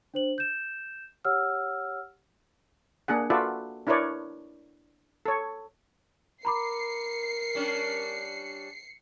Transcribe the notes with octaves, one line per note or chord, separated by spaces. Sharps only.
D4 C5 F#7
G6 E7
G4 C#5 F#5 E6 F6
A#3 D4 G#4 F#5
F4 F#4 A4 B4 D5 E5
D4 E4 A#4 B4 C#5 D5
A4 C#5
A#4 A#5 B5 D6 C7 C#7
G3 C#4 D4